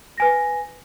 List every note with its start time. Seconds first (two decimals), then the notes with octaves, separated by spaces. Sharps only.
0.18 B4 G#5 A#6